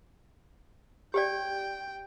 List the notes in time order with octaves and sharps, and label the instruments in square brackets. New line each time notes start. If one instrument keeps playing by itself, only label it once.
[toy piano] G4 D5 [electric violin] G5